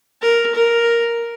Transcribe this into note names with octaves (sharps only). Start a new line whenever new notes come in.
A#4
A#4